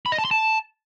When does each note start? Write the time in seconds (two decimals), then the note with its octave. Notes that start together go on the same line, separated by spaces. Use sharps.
0.06 B5
0.12 D#5
0.18 A5
0.25 C6
0.31 A5